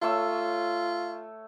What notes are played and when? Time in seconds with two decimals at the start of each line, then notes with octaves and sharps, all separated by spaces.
0.02 A3 F4 C#5 E6